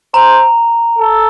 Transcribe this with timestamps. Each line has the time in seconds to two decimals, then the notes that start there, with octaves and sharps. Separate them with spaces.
0.14 C5 A#5
0.98 A4